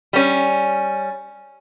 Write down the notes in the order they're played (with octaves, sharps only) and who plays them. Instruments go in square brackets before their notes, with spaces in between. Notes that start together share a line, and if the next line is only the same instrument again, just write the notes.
[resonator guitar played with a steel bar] G3 C#4